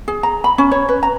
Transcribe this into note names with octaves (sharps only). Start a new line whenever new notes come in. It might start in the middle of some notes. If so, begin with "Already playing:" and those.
G#4
A#5
B5
C#4
C#5
B4
A#5